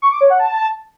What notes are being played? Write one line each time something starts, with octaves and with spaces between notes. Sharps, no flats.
C#6
D6
C#5
F#5
A5